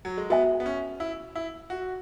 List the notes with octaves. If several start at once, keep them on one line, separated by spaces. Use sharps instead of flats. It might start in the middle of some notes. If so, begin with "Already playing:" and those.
F#3
G#3
B3 F#4 E5 G#5
B3
C#4
E4
E4
F#4